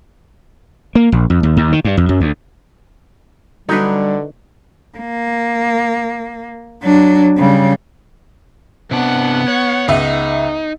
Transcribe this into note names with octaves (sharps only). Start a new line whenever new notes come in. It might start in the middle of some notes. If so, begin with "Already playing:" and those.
A#3
A#1
F2
D#2
D#2
D#3
G2
F2
F#2
D2
D3 F#3 G3 D4 D#4 B4
A#3
F#3 D4
C#3 G3
C3 B3 D4 F#5
C#5
C#2 D#4 E5